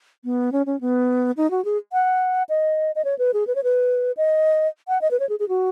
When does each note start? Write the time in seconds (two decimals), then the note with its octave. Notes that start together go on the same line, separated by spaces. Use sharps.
0.25 B3
0.52 C#4
0.66 C#4
0.81 B3
1.37 D#4
1.51 F#4
1.65 G#4
1.93 F#5
2.49 D#5
2.95 D#5
3.05 C#5
3.19 B4
3.34 G#4
3.47 B4
3.55 C#5
3.64 B4
4.17 D#5
4.88 F#5
5.01 D#5
5.11 B4
5.20 C#5
5.29 G#4
5.40 G#4
5.49 F#4